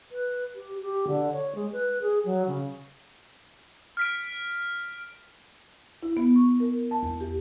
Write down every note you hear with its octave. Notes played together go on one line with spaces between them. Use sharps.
B4
G4
G4
D3
C#5
G#3
B4
G#4
F#3
C#3
F6 B6 D7
E4
B3
C#6
A#4
A5
E2
G4